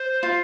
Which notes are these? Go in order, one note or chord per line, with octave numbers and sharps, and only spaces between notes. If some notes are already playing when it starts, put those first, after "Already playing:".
Already playing: C5
F4